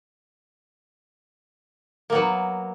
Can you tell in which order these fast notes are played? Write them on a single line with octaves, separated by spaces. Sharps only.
A#3 B3 F#3